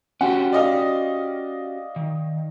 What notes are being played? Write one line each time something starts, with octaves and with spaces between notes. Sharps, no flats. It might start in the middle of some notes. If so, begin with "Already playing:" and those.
C#4 F#4 G4 F#5
D5 D#5 F5
D#3